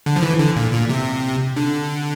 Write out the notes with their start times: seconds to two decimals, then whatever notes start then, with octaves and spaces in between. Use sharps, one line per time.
0.06 D3
0.16 F3
0.22 E3
0.39 D3
0.56 A#2
0.73 A#2
0.89 C3
1.56 D3